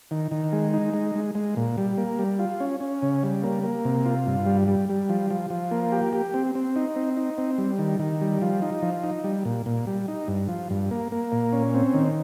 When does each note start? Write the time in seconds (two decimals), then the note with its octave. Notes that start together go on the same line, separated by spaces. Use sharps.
0.11 D#3
0.31 D#3
0.53 G#3
0.74 D#4
0.94 G#3
1.15 G#3
1.35 G#3
1.56 A#2
1.78 G3
1.98 A#3
2.19 G3
2.39 F4
2.60 C#4
2.80 C#4
3.02 C#3
3.23 G3
3.43 A#3
3.63 A#3
3.85 C3
4.06 F4
4.27 G2
4.46 G3
4.68 G3
4.89 G3
5.09 F3
5.30 F3
5.50 F3
5.71 A#3
5.92 G4
6.13 G4
6.34 C4
6.55 C4
6.76 D#4
6.96 C4
7.17 D#4
7.38 C4
7.58 G3
7.79 D#3
7.99 D#3
8.21 G3
8.42 F3
8.62 D#4
8.82 F3
9.03 D#4
9.24 G3
9.45 A#2
9.66 A#2
9.87 G3
10.08 D#4
10.28 G2
10.48 F3
10.70 G2
10.91 A#3
11.12 A#3
11.32 A#2
11.53 C#4
11.74 C4
11.94 D#3